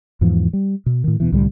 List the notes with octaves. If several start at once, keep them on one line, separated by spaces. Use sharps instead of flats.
E2 G#2 E3 F3
G3
B2
A2 D#3
D#2 B2 E3
C2 A2 D3 G3